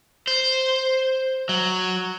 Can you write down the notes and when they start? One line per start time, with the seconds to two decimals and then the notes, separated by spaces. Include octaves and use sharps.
0.27 C5
1.49 F#3